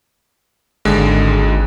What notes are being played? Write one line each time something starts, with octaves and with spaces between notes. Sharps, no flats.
G#1 D#2 D3 G#3